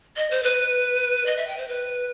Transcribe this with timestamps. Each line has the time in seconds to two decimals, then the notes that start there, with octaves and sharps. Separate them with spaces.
0.17 D#5
0.31 C5
0.43 B4
1.26 D#5
1.37 E5
1.48 G5
1.58 C5
1.68 B4